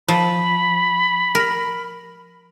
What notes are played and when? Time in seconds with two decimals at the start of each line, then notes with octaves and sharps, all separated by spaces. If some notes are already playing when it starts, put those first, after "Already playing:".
0.08 F3 B5
1.35 A#4